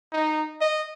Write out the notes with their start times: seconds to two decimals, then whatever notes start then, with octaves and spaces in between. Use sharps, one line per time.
0.12 D#4
0.61 D#5